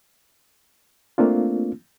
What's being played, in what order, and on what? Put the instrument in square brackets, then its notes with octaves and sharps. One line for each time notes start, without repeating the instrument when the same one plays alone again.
[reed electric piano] A3 A#3 C4 D4 F4